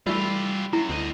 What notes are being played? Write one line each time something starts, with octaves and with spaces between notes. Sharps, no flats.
E3 G3 A3 F4 G4
F#2 E4
D2 C4 D#5